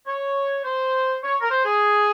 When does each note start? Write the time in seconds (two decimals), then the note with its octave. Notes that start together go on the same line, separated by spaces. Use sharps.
0.07 C#5
0.64 C5
1.23 C#5
1.41 A#4
1.51 C5
1.65 G#4